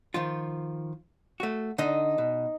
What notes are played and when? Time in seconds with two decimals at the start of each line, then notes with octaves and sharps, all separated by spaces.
0.14 D#3 F3 F4
1.40 A3 F#4
1.78 D3 D#4 D#5
2.18 B2